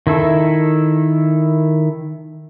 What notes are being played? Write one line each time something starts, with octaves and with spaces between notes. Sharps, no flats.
D#3 E4 A4